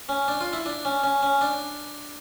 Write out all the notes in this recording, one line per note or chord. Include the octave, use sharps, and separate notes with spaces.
C#4
D4
F4
E4
D4
C#4
C#4
C#4
D4